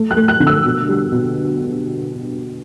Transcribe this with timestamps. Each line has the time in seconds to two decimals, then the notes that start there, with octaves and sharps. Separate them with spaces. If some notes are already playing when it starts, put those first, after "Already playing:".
Already playing: A3
0.11 F#6
0.16 A3
0.28 F#6
0.40 D3
0.47 E6
0.65 B2
0.89 G3
1.12 B2